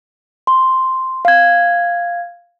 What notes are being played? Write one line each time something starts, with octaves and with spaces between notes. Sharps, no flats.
C6
F5 G#6